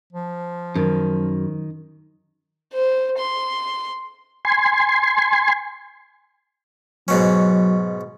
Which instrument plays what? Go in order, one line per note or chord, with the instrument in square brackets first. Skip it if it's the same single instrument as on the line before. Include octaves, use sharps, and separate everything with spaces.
[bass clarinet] F3
[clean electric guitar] F#2 [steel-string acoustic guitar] D#3
[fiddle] C5
C6
[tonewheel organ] G#5 C6
[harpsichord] G#2 B2 C#4 [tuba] F#3